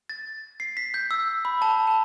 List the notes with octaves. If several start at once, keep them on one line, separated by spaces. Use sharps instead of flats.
A6
C7
B6
G6
E6
B5
A5
A5